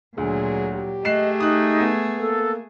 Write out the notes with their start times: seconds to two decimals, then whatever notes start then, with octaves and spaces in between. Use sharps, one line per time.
0.18 D2 A#2 F#3 G#4
0.75 G4
1.05 A3 G#4 D#5 F#6 C7 E7
1.40 D#4 D#6 F#6
1.81 B3
2.19 A#3 A4